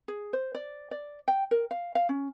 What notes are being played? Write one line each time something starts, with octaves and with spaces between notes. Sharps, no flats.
G#4
C5
D5
D5
G5
A#4
F5
F5
C#4